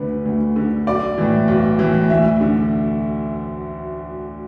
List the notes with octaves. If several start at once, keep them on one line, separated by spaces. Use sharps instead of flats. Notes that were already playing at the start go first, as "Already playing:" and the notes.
Already playing: D2 D3 B4
D2
D3
B1 D5
A2 E3
B1
A2 E3
D2 E5
D3